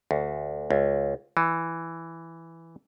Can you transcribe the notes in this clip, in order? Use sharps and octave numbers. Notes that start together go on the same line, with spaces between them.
D2
C#2
E3